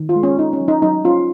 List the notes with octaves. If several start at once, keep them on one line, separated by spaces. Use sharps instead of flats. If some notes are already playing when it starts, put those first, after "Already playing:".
Already playing: D#3
F4
G#3
C#4
C#4 D#4
C#4
F#3
D#4
F#3 D#4
C#4 F4